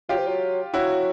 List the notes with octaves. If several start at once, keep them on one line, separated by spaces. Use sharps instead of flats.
F#3 F4 G4
F3
F#3
F#3 E4 F#4